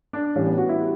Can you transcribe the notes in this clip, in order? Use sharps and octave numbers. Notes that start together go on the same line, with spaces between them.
D4
A2 E3 G3 C#4
B3
F#4
E4
G3